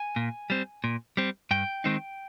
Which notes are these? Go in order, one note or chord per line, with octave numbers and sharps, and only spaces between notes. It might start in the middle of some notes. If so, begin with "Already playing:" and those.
Already playing: G#5
A#2
G3 C4
A#2
G3 C4
G2 G5
D#3 G#3 C4 D#4